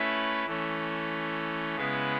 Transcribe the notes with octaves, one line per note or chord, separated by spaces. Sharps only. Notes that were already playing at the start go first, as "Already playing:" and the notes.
Already playing: A3 C#4 E4 B4
E3 A3 C#4
C#3 G#3 B3 E4 B4